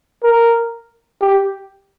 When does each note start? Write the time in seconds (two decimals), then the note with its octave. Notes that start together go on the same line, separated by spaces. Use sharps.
0.23 A#4
1.21 G4